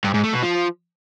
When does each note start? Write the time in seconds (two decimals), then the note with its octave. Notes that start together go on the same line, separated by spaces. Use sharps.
0.04 G2
0.14 G#2
0.24 A3
0.33 B2
0.43 F3